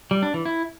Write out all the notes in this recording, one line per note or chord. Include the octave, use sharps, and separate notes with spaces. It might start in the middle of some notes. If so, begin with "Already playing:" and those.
G3
D4
E3
E4